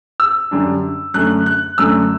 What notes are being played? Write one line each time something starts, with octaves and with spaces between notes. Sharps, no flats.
E6
F#2 D3 G3 D4
F#2 D3 A3 F#6
F#6
F#2 D3 A3 E6